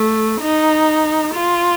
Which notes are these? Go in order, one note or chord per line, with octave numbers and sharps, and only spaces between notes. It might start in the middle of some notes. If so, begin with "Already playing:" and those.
Already playing: A3
D#4
F4